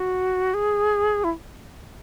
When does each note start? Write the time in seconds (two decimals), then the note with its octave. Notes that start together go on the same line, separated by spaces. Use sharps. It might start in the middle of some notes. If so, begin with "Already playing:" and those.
Already playing: F#4
0.54 G#4
1.24 E4